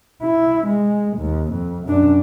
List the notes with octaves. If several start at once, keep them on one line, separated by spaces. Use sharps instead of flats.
E4
G#3
D#2
F2
F#2 D4